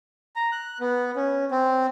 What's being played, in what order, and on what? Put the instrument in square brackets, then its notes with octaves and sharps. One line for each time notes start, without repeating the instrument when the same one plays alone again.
[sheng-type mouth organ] A#5
F#6
B3
C#4
C4